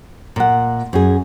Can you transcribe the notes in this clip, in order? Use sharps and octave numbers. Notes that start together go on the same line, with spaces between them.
A#2 F#5
F#2 G#4